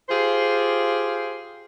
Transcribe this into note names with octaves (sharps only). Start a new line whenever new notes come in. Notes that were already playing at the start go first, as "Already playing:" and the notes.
F4 G4 G#4 C5 F5